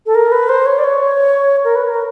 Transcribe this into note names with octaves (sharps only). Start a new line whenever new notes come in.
A4
A#4
B4
C5
C#5
D5
C#5
A#4
B4
A#4